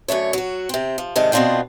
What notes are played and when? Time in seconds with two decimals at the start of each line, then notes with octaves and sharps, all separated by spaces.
0.08 F#2 D3 A3 C#5
0.33 F#3 F#4
0.69 C3 C4
0.98 F3
1.16 G#2 C3 D#3 D4
1.32 B2 B3 C4 D4 F4 G5